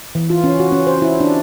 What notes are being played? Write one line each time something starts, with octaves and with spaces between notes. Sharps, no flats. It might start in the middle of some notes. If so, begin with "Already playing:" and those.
E3
F4
C#4
F#4
C#4
C5
E4
D4